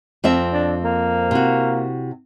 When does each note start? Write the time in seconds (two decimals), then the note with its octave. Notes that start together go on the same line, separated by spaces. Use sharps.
0.24 F2 C4 E5
0.53 D4
0.84 A#3
1.31 C3 E4 F#4